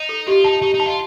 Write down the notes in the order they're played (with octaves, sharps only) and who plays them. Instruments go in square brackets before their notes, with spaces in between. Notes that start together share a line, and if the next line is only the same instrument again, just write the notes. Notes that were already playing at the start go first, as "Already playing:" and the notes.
Already playing: [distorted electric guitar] D#4
[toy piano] A4
[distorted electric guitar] F4 [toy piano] G4
[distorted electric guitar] D#4 [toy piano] A5
[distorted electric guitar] D#4 [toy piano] G4
[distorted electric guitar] D#4
[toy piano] A5
[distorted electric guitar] F4